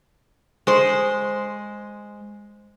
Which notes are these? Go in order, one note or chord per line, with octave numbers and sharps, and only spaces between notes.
G#3 C5